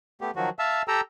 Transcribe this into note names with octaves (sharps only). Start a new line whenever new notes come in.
A3 B3 G4
D#3 F3 F#3 F#4
E5 F5 A5 E6
G4 A4 G5 A#5 E6